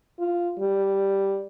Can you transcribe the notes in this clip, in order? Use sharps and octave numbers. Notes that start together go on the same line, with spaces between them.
F4
G3